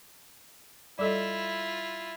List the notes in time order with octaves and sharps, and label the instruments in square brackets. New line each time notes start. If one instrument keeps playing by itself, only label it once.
[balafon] G3 A4 D#5 [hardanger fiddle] E4 F4